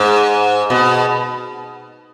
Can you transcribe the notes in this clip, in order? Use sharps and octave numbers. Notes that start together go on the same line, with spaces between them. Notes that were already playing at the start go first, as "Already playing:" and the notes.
Already playing: G#2
B2